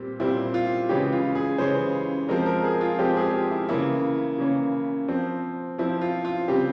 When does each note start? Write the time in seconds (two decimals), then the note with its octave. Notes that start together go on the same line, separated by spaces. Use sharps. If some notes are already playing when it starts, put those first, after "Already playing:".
Already playing: A#2 G3 C4 G4
0.20 A#2 G3 C4 E4
0.54 F4
0.89 C#3 E3 G#3 C#4 G4
1.12 F4
1.35 G#4
1.58 C#3 E3 G#3 C#4 C5
2.29 F3 G#3 C4 A#4
2.46 A#4
2.64 G#4
2.81 F4
2.99 F3 G#3 C4 G4
3.17 G#4
3.33 G4
3.51 E4
3.69 C#3 E3 A#3 C#4 E4
4.38 C#3 E3 A#3 C#4
5.08 F3 C4
5.78 F3 C4 E4
6.01 F4
6.25 F4
6.48 C#3 G3 C4 G4